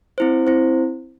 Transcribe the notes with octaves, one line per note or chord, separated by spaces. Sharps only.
C4 E4 C5
C4 E4 C5